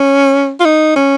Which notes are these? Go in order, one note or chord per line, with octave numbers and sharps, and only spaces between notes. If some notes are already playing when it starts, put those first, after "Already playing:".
Already playing: C#4
F4
D#4
C#4